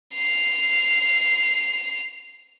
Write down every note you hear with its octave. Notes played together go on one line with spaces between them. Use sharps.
C7 F7